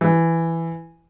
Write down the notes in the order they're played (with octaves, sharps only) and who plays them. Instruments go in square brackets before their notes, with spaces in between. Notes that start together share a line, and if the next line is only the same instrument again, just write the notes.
[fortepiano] E3